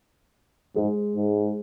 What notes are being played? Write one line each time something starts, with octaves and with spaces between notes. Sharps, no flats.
G#2 G#3
G#2